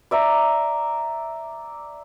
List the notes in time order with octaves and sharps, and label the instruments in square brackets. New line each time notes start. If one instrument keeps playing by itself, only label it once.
[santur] D5 E5 A#5 D6